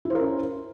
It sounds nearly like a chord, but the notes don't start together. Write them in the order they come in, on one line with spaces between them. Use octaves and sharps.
E4 C5 A#4 C#4